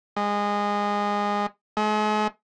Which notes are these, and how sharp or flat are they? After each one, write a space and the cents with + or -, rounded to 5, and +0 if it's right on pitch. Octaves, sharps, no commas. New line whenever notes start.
G#3 -20
G#3 +40